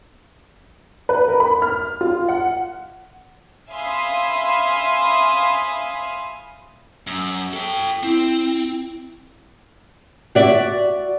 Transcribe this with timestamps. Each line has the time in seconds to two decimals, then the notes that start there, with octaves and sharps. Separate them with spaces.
1.09 B4
1.28 A#4
1.40 B5
1.62 F6
2.01 F4
2.28 F#5
3.69 E5 F5 G#5 B5 C6 D#6
7.07 F#2
7.53 A4 G5
8.03 C4 E4
10.35 F#4 D5 E5